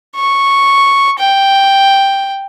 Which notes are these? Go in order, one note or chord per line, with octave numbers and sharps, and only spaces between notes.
C#6
G5